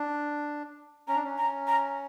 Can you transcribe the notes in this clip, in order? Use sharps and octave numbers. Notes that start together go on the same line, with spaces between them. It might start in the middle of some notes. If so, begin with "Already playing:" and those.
Already playing: D4
C#4 A#5
D4
C#4
A#5
A#5